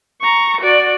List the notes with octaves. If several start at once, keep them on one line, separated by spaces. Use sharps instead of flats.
A#5 C#6
F#4 D5